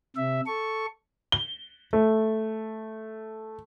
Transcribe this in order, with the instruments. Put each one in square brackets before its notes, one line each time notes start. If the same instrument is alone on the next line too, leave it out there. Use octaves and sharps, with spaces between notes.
[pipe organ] C3 E5
A4 C#6
[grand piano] G7
A3